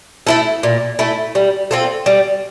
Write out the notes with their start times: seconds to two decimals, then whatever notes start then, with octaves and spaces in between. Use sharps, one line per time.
0.27 A3 E4 A4
0.63 A#2
0.99 A3 E4 A4
1.35 G3
1.71 C4 F4 A4
2.06 G3